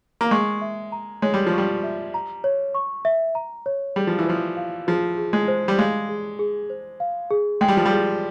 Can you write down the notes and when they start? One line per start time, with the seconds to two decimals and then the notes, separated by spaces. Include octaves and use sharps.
0.21 A#3
0.31 G#3 C#6
0.62 E5
0.92 A#5
1.22 G#3 C#5
1.34 G3
1.47 F3
1.53 G3 C#6
1.83 E5
2.14 A#5
2.44 C#5
2.75 C#6
3.05 E5
3.35 A#5
3.66 C#5
3.96 G3 G#4
4.07 F3
4.19 E3
4.27 F3 C5
4.57 F5
4.87 F3 G#4
5.18 G#4
5.33 G#3
5.48 C5
5.68 G3
5.78 G#3 F5
6.09 G#4
6.39 G#4
6.70 C5
7.00 F5
7.30 G#4
7.61 G#3 G5
7.68 G3
7.77 F3
7.86 G3
7.91 G#4